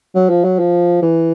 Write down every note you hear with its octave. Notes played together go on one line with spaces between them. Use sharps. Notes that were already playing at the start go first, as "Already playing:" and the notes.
F#3
F3
F#3
F3
E3